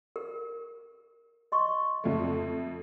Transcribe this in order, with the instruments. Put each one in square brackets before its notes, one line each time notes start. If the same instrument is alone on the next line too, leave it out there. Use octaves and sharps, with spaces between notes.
[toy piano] A#4
D#5 C6 C#6
[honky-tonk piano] F2 A3